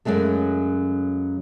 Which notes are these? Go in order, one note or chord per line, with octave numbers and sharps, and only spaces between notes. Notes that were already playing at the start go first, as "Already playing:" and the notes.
F#2 C#3 F#3 G#3 A3